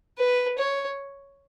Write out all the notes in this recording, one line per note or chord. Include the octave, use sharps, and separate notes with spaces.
B4
C#5